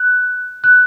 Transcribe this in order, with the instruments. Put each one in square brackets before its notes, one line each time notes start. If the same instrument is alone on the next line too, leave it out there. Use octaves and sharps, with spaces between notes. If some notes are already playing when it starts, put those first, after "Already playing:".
Already playing: [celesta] F#6
F#6